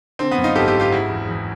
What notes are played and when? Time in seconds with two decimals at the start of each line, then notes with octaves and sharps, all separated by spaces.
0.19 D3 C4
0.31 B3
0.38 F#2
0.43 D#4 F4
0.55 G#1 G4 A4
0.68 G4 A4
0.74 G#1
0.80 F4 G4
0.92 C#3 E4 F#4
1.10 E2
1.29 E3